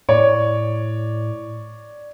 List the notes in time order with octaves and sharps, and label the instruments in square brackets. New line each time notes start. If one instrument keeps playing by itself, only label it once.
[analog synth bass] A2 [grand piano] C#5 D5